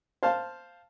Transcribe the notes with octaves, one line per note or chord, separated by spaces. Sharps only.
C5 F5 A5